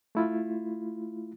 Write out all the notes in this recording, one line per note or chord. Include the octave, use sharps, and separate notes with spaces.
A3 E4 F4